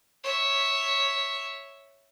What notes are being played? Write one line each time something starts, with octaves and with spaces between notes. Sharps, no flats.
C#5 E5